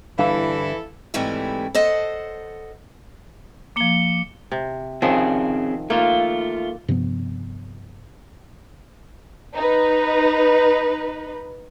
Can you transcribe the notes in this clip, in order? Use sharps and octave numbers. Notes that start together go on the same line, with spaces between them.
G1 E3 G3 D4 E4 A4 F5
G#2 C3 E3 G3 A3 E4
A4 C5 D#5 F#5
F3 A#3 D6 C#7 G7
C3
D#3 F3 C4 C#4 G#4
A3 A#3 F4
G2 C3 F3 B3
D#4 B4